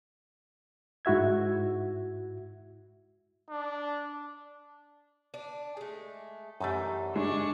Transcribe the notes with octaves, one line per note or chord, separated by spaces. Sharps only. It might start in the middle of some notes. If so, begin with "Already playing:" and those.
G#2 E4 F#4 E5 G#6
D4
D4
G#3 A3
F#2 E3 G3 A3 D#4
G#3 D4 C#6